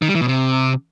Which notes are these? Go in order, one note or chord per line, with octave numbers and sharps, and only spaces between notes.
D#3
G3
E3
B2
C3